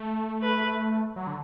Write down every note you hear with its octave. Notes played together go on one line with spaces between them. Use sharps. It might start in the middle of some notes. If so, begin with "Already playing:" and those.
Already playing: A3
B4
F#3
D3